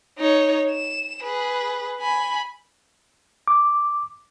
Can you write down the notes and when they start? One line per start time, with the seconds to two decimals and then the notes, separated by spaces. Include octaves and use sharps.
0.18 D#4 C#5
0.71 E7
1.23 G#4 B4
2.01 G#5 B5
3.48 D6